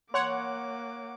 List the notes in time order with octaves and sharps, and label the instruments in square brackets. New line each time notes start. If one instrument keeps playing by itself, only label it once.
[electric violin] A#3 D6 [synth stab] C#5 F#5 [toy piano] C6